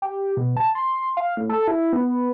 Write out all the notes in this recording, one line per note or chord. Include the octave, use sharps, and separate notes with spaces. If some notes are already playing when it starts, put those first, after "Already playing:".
G4
B2
A5
C6
F5
A2
A4
E4
B3